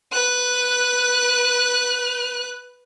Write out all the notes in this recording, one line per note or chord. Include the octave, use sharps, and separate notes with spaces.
B4 F#6